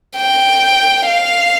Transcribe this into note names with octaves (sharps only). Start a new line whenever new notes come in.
G5
F5